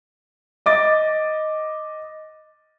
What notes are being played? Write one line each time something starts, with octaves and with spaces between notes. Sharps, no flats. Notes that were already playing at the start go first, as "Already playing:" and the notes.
D#5 D6 A6